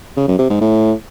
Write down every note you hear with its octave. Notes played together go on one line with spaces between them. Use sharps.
C#3
F#2
C3
G#2
A2